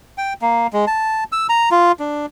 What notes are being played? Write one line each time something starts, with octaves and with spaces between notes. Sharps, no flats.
G5
A#3
G#3
A5
E6
A#5
F4
D4